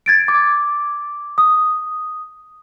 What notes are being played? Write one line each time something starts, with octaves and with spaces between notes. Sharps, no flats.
G#6 A6 D7
D6
D#6